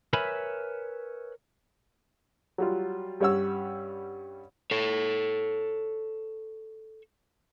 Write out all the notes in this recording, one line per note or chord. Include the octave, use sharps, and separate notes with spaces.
A#4 B4 C#5 E5 G#5 B5
F#3 G3 F4
G2 G3 C#4 C#5 F#5 E6
A4 C#5